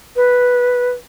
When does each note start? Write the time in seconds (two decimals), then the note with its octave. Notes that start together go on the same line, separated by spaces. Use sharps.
0.16 B4